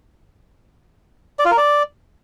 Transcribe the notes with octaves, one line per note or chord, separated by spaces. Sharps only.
D5
F4
A#4
D5